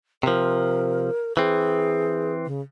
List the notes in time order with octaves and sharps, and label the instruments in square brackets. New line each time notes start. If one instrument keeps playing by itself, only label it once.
[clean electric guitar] C3 F3 [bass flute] A#4
[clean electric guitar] E3 C4 [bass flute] G#4
[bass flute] C#3